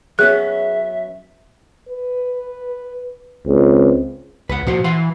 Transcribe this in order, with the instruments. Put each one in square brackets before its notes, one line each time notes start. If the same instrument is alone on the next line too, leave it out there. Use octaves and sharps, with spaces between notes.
[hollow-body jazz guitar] F#3 B3 C#4 [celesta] G#4 [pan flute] E5 [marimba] F#6
[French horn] B4
[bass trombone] C#2 [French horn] C4
[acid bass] C#2 [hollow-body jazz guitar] B4 F#5
[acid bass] A#2 [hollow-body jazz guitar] F3 F#4 C5
[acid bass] E3 [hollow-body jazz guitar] F5 F#5 C6